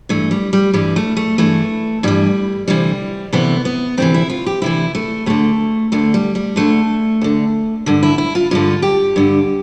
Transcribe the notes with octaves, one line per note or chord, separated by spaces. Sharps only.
G2 E3 A3
G3
G3
G2 E3 G3
A3
A3
G2 E3 A3
G2 E3 G3
D2 C3 E3 G3
D2 C3 E3 B3
B3
D2 C3 E3 C4
E4
F4
G4
D2 C3 E3 E4
A3
D2 D3 A3
D2 D3 A3
G3
G3
D2 D3 A3
D2 D3
G2 D3
E4
E4
F4
G2 D3 F4
G4
G2 D3